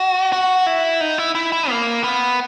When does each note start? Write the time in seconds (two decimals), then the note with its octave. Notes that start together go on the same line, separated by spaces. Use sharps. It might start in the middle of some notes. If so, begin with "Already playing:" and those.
Already playing: F#4
0.32 F#4
0.66 E4
1.01 D#4
1.18 E4
1.35 E4
1.52 E4
1.70 A#3
2.04 B3